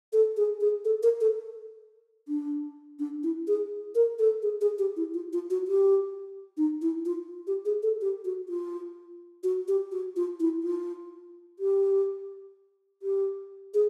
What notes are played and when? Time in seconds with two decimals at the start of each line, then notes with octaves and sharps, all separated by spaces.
0.13 A4
0.37 G#4
0.61 G#4
0.85 A4
1.03 A#4
1.21 A4
2.28 D4
2.99 D4
3.23 E4
3.48 G#4
3.95 A#4
4.19 A4
4.42 G#4
4.61 G#4
4.78 G4
4.96 E4
5.14 F4
5.33 F4
5.50 F#4
5.68 G4
6.57 D#4
6.82 E4
7.05 F4
7.47 G4
7.65 G#4
7.83 A4
8.01 G4
8.25 F#4
8.49 F4
9.43 F#4
9.68 G4
9.92 F#4
10.16 F4
10.40 E4
10.63 F4
11.59 G4
13.02 G4
13.74 G#4